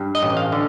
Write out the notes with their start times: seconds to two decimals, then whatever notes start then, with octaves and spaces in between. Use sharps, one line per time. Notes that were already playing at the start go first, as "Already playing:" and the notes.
Already playing: G2
0.15 D#5
0.23 A1
0.37 F5
0.52 D3